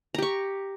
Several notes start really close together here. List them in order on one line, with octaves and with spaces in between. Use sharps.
A#5 G4 C#6